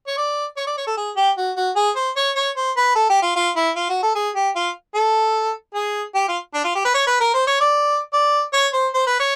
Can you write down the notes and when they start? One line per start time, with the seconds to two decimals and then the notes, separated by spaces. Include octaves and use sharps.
0.07 C#5
0.17 D5
0.57 C#5
0.67 D5
0.77 C#5
0.87 A4
0.97 G#4
1.17 G4
1.37 F#4
1.57 F#4
1.76 G#4
1.96 C5
2.17 C#5
2.36 C#5
2.57 C5
2.77 B4
2.96 A4
3.10 G4
3.22 F4
3.36 F4
3.56 E4
3.76 F4
3.89 F#4
4.03 A4
4.15 G#4
4.35 G4
4.56 F4
4.95 A4
5.75 G#4
6.15 G4
6.28 F4
6.54 D4
6.64 F4
6.75 G4
6.85 B4
6.94 C#5
7.07 B4
7.21 A#4
7.34 C5
7.47 C#5
7.61 D5
8.13 D5
8.53 C#5
8.73 C5
8.94 C5
9.07 B4
9.20 C#5